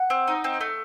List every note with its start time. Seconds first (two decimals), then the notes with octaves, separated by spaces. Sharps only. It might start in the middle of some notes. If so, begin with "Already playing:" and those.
Already playing: F#5
0.10 C4
0.28 D#4
0.44 C4
0.61 A3